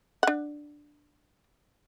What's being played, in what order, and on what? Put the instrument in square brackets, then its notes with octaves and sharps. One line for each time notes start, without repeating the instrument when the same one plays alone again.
[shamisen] D4 F#5